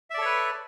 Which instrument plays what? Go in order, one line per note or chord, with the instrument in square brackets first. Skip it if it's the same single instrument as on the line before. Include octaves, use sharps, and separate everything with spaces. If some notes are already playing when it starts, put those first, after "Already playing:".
[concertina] E5
D5
A4
C#5
B4